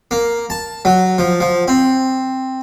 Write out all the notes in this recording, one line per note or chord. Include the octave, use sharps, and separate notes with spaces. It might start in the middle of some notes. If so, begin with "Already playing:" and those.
A#3
A5
F#3
F3
F3
C4